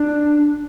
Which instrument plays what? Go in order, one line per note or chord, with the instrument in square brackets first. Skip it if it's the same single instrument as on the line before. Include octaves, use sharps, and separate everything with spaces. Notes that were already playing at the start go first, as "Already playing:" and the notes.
Already playing: [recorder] D4